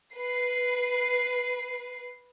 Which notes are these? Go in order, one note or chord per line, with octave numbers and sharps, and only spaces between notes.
B4 C7